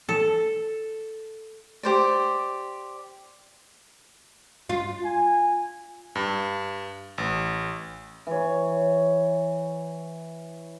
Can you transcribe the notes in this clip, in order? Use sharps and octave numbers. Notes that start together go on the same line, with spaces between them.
A4
G4 C5 D5
F4
G#5
G2
A1
E3 C#5